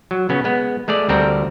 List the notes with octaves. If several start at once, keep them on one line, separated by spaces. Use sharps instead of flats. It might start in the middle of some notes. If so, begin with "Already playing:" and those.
F#3
C#3 B3 C#4
G#3 B3
G#3 A3 G#4 D5
D2 G3 C4 A4 A#4 A#5